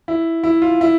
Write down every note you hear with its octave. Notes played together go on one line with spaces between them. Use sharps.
E4
E4
F4
E4